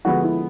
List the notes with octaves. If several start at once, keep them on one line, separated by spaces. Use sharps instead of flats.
D3 F3 G#3 B3 F#4
E4